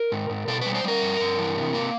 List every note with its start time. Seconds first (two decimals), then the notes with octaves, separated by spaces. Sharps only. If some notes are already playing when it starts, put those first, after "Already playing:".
Already playing: A#4
0.12 G#2
0.30 G#2
0.48 B2 A4
0.61 G3 B4
0.75 C5
0.84 G3 A#4
1.02 G2
1.20 G2
1.38 E3
1.56 C3
1.74 A#3